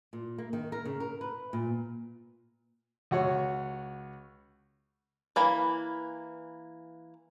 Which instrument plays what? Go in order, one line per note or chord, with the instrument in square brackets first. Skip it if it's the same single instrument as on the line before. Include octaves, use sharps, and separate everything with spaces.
[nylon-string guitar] A#2
A#3
D#3
A#4
C#3
A#4
B4
A#2
[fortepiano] C#2 F#4 C#5
[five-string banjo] E3 A#3 B5